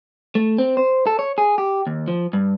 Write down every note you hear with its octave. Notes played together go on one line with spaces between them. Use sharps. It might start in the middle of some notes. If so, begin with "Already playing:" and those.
A3
C4
C5
A4
C#5
G#4
G4
D#2
F3
G2